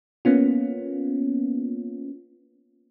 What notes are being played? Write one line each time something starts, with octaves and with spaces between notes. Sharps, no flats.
A#3 B3 C#4 F4